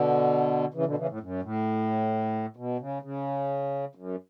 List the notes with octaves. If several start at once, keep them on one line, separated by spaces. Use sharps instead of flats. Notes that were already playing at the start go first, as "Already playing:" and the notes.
Already playing: B2 D3
C#3 E3
B2 D3
C#3 E3
A2
F#2
A2
B2
C#3
C#3
F#2